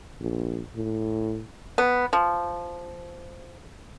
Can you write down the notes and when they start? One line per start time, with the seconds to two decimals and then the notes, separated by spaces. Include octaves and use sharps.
0.20 A#1
0.75 A2
1.78 B3
2.13 F3